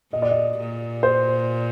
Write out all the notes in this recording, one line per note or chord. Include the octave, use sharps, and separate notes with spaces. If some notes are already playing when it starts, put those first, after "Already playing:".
A#2 D#5
D5
D#5
A#2
C5